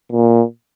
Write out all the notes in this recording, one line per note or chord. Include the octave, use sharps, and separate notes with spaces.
A#2